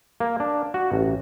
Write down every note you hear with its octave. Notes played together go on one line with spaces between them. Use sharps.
A#3
D4
F#4
A1